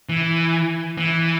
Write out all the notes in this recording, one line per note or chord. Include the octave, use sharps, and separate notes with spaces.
E3
E3